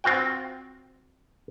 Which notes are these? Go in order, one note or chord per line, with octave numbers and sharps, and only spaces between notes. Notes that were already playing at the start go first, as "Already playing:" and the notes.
C4 F4 F#4 G5